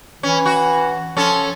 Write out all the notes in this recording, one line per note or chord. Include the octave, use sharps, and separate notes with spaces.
E3 C#4
F#4
F3 C#4 A4